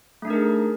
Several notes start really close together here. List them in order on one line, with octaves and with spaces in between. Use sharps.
A3 D4 D#4 A#4 G#4